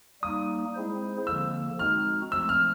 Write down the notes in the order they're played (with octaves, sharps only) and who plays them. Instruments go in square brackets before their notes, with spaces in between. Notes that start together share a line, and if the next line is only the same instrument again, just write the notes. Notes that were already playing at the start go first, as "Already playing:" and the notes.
[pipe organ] G3 A#3 D#4 [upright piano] D#6
[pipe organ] G#3 C4 E4 G#4 C5
[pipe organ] D3 F3 A#3 [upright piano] E6
[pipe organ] G#3 C4 D#4 F#4 [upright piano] F6
[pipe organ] F3 A3 C4 [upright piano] E6
[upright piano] F6